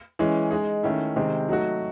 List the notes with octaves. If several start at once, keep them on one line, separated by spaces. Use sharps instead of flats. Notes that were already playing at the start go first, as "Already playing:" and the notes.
E3 G#3 C#4
G#3 D#4 G#4
D#3 A3 C#4 E4
C3 D#3 G#3 C4
F#3 A3 D#4 F#4